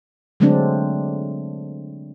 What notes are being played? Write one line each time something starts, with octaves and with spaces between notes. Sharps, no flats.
D3 F#3 G#3 A3 C4 D4